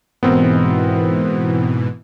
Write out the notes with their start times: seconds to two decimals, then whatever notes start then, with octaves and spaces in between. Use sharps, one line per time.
0.23 G#2 B2 E3 B3 C4 A#4